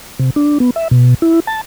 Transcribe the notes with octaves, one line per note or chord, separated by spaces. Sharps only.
C3
D4
B3
E5
B2
E4
A5